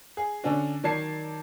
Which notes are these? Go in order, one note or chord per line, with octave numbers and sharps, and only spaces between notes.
G#4
D3 C#4 D4 F#4
D#3 F#3 D5 A5 G#6 C7